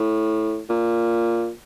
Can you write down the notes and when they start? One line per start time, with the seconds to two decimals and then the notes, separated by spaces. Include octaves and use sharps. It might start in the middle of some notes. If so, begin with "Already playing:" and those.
Already playing: A2
0.69 A#2